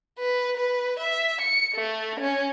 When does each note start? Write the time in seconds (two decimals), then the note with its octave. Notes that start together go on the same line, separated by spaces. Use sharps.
0.18 B4
0.57 B4
1.00 E5
1.41 C#7
1.75 A3
2.20 C#4